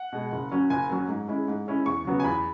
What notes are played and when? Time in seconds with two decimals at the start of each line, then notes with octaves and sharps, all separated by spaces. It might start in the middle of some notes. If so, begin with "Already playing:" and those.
Already playing: F#5
0.12 B2 G#3
0.32 F#1
0.52 F#2 F#3 C#4
0.70 F#1 G#5
0.89 F#2 F#3 C#4
1.08 G#2
1.28 G#3 C#4 E4
1.48 G#2
1.67 G#3 C#4 E4
1.86 E2 C#6
2.05 C#3 F#3 B3
2.20 G#5
2.24 E2 B5